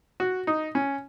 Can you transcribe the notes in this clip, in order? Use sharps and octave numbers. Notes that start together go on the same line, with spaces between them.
F#4
D#4
C#4